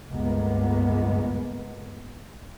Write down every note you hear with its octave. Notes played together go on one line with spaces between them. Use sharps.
G1 C#2 A2 G#3 A#3 B3